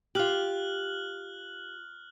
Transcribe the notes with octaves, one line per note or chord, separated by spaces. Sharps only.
F4 G4 F6 F#6 F#7